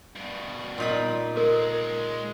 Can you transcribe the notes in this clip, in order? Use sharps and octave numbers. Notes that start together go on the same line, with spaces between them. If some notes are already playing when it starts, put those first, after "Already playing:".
G2 B2
A#2 D#4 B5
G#3 C#4 A#4